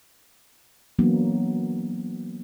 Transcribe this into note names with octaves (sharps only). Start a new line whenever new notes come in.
E3 F#3 A#3 B3 D4